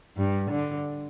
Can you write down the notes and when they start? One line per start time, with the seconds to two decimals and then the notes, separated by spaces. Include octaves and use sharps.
0.17 G2
0.51 D3